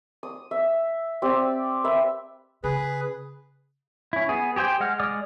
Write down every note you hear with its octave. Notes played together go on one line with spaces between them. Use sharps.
D#6
E5
C4 G4 D5
B4 E5
C#3 G#4 B4
C#4 E4
B3 G#4
G4 G#4 C5 G5
G#3 F#5 F6
G#3 D5 D6 D#6 F6